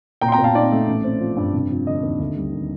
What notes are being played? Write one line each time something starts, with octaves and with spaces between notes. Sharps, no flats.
A#2 G5 A#5
C6
G5 A#5
A#2
F5 A5
D#4 D5
A3
A1
C4
F3
G2
F1
F3
D3 D#5
D#2
D2
G3
D#3